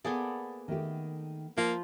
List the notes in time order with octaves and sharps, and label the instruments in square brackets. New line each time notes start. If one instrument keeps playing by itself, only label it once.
[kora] A#3 G#4 [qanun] B3 A4 D5
[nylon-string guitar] D#3 A3 G4
[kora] F3 F4 [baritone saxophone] A#3